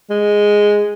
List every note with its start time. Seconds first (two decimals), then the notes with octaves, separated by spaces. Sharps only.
0.10 G#3